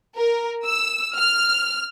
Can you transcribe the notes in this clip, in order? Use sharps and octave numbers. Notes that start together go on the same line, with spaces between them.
A#4
E6
F6